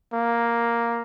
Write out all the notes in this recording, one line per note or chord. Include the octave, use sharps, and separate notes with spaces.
A#3